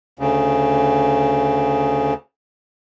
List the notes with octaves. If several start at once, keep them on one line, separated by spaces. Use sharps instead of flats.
D2 C#3